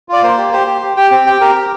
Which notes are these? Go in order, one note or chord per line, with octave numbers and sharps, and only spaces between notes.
F4 D5
A#3 C5
G4
G4 C5
G4
G4
G4 G5
C4 G5
G4 G5
G4 A#4
G4